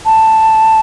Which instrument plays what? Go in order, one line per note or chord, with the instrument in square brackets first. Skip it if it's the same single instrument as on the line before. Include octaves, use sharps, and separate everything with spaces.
[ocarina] A5